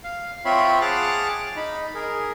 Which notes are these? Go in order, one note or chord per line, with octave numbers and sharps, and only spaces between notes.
F5
C4 F4 C#5 E5 B5 C6
G#4 F#5 A5 D6 F6 F#6
D#4 B5
G#4 A#4